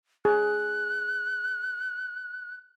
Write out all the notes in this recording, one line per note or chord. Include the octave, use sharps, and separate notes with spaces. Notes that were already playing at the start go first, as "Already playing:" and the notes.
G#4 F#6